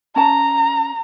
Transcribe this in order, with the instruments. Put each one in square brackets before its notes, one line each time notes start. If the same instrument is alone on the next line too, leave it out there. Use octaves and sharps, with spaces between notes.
[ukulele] C#4 A5 [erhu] A#5